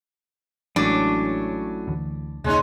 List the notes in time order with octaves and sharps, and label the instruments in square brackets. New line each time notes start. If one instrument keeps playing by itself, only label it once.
[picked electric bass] A1 E3 G#3 [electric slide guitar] A2 F#3 C#4 [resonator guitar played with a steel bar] D4
[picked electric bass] D2 E3
[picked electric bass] E1 C#2 A#3 [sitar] G#3 C#4 D#4